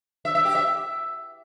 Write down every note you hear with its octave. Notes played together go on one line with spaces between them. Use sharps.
E5
E5
G4
E5